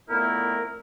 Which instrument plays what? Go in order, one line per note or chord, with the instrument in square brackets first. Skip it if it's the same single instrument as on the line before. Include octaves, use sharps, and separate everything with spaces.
[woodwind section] F2 A#2 A3 B3 E4 A#4